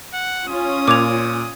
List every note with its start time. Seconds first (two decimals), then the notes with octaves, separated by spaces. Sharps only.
0.13 F#5
0.48 C#4 F4 D#6
0.88 A#2 D6 G#6 F7